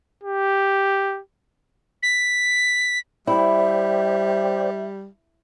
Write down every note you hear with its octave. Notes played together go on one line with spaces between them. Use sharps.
G4
B6
G3 E4 C5 D5 E5 G5